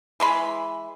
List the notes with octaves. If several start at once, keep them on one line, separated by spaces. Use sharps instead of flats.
E3 G#3 B5